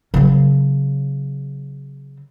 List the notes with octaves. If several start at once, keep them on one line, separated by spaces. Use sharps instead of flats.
C#3 F#3